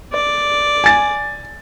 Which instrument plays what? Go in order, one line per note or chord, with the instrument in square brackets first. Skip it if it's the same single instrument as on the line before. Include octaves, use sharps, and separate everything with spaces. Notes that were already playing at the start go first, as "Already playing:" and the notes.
[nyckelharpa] D5
[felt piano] G#5 A6